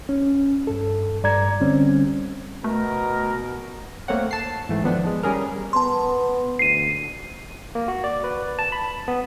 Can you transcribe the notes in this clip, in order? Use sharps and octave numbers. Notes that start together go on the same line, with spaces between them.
C#4
G2 A4
G2 D5 A#5 G#6
D3 G3 C4 C#4
B2 A3 A#4
A3 A#3 C4 C#5 F#5
A5 C7
G#2 E3 A3
D#3 F3 B3 D4
G#3
G3 C#4 G#4 A#4
B3 A5 C6
D2 C7 D#7
A#3
F#4
D5
B4
A5
B5
B3